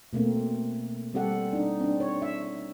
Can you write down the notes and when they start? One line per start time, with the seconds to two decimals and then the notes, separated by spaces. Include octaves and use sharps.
0.13 B2 A3 A#3 C4
1.14 G3 C4 G4 A4 F#5
1.53 D4 D#4
1.80 C4 D4
2.00 C#5
2.22 E5